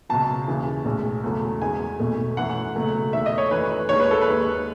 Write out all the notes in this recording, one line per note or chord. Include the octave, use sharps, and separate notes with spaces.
C#2 B2 F#3 A5
D#2 C#3 E3
B1 A2 G#3
E2 C#3 F#3 A3
E2 D#3 G#3 G#5
B1 B2 A3
F#2 E3 A3 F#5
C#2 B2 F#3 A3
E2 D#3 A3 E5
D#5
C#5
F#2 E3 A3 B4
D#2 D#3 G#3 C#5
B4
A4
B4
D#2 D#3 G#3